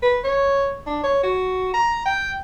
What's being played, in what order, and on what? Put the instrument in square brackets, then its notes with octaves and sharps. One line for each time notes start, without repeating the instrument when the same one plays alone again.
[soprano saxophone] B4
C#5
D4
C#5
F#4
A#5
G5